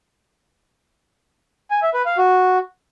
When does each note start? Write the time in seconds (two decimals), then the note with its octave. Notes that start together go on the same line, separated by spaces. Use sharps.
1.71 G#5
1.82 E5
1.94 B4
2.06 F5
2.17 F#4